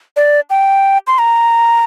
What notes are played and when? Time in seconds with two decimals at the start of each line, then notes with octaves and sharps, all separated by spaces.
0.16 D5
0.50 G5
1.07 C6
1.19 A#5